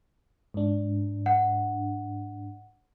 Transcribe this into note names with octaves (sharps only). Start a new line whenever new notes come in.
G#2 D4
F#5